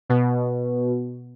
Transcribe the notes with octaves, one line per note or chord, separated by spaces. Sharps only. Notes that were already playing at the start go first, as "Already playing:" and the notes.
B2